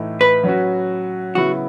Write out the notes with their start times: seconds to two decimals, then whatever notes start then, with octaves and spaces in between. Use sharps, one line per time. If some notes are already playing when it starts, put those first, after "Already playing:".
Already playing: A2 E3 A3 D#4
0.21 B4
0.43 F#3 C#4 F#4
1.35 C#3 F#3 B3 E4 F#4